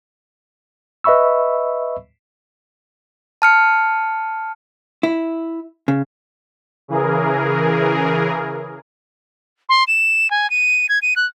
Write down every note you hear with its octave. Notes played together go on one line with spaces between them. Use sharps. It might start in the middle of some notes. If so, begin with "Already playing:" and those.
B4 D#5 E5 B5 C#6 E6
A5 F6 C#7
E4
C#3
C#3 E3 G#4 A#4
C6
E7
G#5
D#7
G#6
D#7
F#6